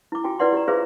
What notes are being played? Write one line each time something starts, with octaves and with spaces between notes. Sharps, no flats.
E4 D6
F4 F#4 G5 G#5
E4 B4 D5 F#5 C6
G4 D5 A#5
F4 G#4 B4 C5 E5 F5